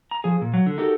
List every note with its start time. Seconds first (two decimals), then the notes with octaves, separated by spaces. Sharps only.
0.11 A#5
0.24 F3 G#4
0.41 A#2
0.54 F#3
0.66 D3
0.78 D#4 F#4 G4 A4 A#4